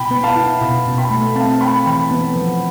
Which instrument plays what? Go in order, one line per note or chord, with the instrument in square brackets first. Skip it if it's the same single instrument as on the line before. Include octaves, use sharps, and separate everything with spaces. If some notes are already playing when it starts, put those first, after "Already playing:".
Already playing: [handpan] B2 [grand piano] G5 B5
[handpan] B3
[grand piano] F5 A5
[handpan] E4
B2
B2
[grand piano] G5 B5
[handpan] A3
[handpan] C4 [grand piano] F5 A5
[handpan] A3 [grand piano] G5 B5
[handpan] E3 [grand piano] G5 B5
[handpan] B3
F3